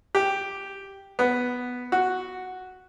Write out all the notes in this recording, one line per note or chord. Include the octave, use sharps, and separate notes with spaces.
G4
B3
F#4